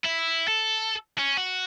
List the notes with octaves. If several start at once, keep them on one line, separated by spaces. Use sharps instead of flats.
E4
A4
C#4
F#4